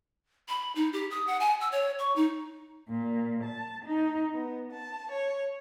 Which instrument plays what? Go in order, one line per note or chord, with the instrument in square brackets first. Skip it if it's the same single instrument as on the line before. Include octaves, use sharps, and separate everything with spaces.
[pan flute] B5
D#4
G4
D#6
F#5
G#5
E6
C#5
C#6
D#4
[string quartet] A#2
A5
D#4
B3
A5
C#5